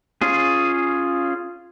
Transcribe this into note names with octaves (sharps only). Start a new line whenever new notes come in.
C#4 F4 G#4